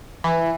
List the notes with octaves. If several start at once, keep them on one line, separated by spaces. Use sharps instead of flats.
E3